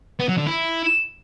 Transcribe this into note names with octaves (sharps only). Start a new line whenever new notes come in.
B3
F#3
D3
E4